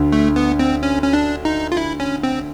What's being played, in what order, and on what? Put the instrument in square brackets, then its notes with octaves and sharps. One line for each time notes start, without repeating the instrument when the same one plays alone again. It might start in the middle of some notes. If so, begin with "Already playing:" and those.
Already playing: [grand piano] D2 D3
[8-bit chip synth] A3
B3
C4
C#4
C#4
D4
D#4
F4
E4
C#4
C4